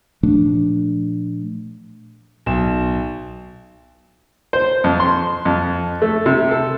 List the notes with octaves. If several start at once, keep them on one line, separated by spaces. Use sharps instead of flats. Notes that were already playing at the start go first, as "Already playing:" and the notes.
A#2 F3 A3 D4
B1 E7
C5
F2
C6
F2
A3
C3
A4